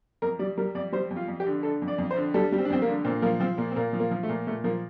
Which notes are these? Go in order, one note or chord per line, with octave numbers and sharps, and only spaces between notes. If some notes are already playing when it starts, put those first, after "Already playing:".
F2 A#4
G3 D5
G3 A#4
F2 D5
G3 C5
F2
F4
F2
G4
D3
D3 A4
F2
D5
F2
C5
D3
G3 A4
G3
C4
D4
F2 C4
A#3
D3
A#2 C4
F3 A#3
F3 C4
A#2 A#3
C4
A#2 A#3
F3
A#3
F3
A3
A#2
A#2 A3
F3 A#3